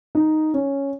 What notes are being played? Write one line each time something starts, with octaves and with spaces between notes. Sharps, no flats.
D#4
C#4